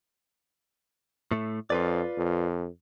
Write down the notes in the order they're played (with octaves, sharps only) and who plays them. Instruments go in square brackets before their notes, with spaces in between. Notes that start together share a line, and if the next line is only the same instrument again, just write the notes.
[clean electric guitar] A2 A3
[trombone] F2 [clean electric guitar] F4 B4 D5
[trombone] F2